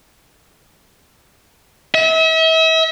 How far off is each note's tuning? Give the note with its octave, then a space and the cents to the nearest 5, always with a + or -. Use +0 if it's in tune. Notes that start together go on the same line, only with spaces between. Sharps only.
E5 -40